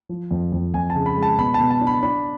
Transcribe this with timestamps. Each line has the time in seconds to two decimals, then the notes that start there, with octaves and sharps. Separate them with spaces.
0.09 F3
0.31 F2
0.52 F2
0.74 F2 G#5
0.90 A5
0.95 C#3
1.06 B5
1.17 G#3
1.22 A5
1.38 B2 B5
1.54 A5
1.60 B2
1.71 A5
1.81 D4
1.87 B5
2.02 D4 B5